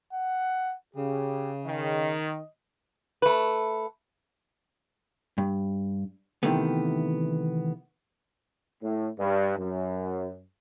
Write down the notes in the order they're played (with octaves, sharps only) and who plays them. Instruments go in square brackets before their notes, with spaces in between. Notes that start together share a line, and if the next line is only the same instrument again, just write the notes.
[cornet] F#5
[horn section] C#3 [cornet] G4
[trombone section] D#3 [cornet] D#5
[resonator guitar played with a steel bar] A3 B4
[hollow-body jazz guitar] G2
C3 D#3 E3 A3 B3
[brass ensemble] A2
G2
F#2